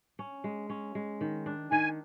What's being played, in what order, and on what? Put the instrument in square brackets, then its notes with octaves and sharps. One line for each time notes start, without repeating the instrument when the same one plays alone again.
[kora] C#4
G#3
C#4
G#3
D#3
D4
[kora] D#3 [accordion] G#5